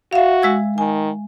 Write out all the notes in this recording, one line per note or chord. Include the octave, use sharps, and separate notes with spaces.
F#4 E5 F5
G#3 E6 G#6
D#3 G#5